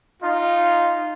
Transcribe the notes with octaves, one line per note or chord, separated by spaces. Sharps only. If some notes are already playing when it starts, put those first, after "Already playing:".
D#4 F4